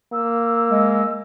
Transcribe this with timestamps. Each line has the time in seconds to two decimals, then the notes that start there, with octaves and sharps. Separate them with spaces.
0.13 A#3 E6
0.71 G#3